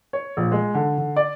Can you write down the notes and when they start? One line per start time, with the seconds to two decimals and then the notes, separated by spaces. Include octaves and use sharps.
0.13 C#5
0.37 A#1
0.52 G#3
0.74 D3
0.98 D3
1.16 D5